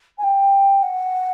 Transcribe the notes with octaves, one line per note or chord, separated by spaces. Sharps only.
G#5
G5
F#5